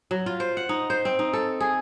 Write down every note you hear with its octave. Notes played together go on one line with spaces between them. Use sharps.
F#3
F4
C5
F#5
D#4
C5
C4
D#4
A4
G#4